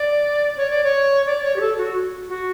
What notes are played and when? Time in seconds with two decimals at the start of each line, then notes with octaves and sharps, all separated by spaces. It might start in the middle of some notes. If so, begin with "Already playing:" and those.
Already playing: D5
0.57 C#5
0.70 D5
0.84 C#5
1.26 D5
1.43 C#5
1.56 G4
1.61 A4
1.78 F#4
2.29 F#4